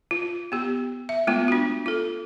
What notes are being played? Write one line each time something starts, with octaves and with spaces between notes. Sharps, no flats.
F4
B3 G4
E5
G#3 A3 B3 F4
D4 F#4
F4 A4